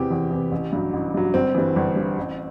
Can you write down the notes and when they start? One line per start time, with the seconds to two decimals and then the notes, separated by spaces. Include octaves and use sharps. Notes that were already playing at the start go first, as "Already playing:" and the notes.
Already playing: E2 C3 E3 G4
0.11 E2
0.31 C3 E3
0.52 A1
0.72 G2 F#3
0.93 A1
1.14 G2 F#3
1.34 G1 C4
1.55 G2 E3
1.76 G1
1.96 G2 E3
2.17 A1